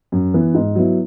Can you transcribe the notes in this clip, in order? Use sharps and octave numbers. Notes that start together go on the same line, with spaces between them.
F#2
E3 B3
G#2
F#3 B3 E4